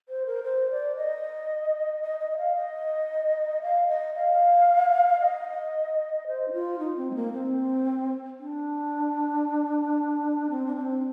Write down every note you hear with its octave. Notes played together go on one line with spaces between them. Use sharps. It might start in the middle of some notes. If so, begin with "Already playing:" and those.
C5
A#4
C5
D5
D#5
D#5
D#5
D#5
F5
D#5
F5
D#5
F5
D#5
C5
D#4
F4
D#4
C4
G#3
A#3
C4
D4
C4
D4
C4